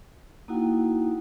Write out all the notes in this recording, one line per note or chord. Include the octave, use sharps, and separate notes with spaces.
A#3 D#4 E4 F#4 F#5 G5